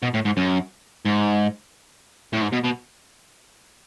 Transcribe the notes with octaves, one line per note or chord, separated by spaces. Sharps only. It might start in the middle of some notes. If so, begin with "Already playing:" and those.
B2
A2
G#2
F#2
G#2
A2
G#2
B2
B2